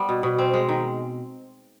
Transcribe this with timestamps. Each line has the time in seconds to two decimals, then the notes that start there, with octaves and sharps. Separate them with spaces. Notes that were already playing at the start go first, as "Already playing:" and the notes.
Already playing: G3 B3
0.09 B2
0.23 B2
0.38 C4
0.54 G#3
0.69 D#3